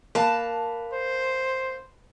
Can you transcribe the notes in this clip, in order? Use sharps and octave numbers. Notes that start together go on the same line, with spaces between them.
A#3 B4 A5
C5